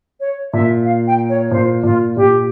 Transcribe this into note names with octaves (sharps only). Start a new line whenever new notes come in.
C#5
A#2 E5
F5
G5
C#5
A#2 C5
A#2 F4
A#2 G4